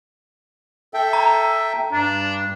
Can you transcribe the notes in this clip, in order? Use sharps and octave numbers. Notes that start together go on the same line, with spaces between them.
A4 E5 G5
A#5
G2 D4